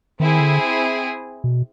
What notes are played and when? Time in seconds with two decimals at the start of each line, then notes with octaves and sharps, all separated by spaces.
0.19 D#3 C4 E4 G#4
0.40 D3
1.44 B2